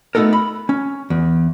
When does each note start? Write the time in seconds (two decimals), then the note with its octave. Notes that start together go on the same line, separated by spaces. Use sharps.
0.15 A3 B3 D#4 A4 A#4
0.33 B5
0.69 C#4
1.10 E2